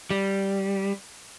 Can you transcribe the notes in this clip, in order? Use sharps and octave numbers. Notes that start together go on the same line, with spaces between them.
G3